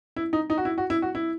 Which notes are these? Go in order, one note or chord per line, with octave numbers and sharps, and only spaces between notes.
E4
D#4
D#4
F#4
E4
F#4
E4
F#4
E4